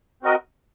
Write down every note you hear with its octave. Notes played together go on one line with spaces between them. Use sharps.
C4 F#4 A#4 D#5